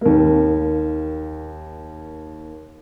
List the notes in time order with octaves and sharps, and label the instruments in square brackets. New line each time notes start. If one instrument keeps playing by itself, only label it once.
[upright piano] D#2 A#3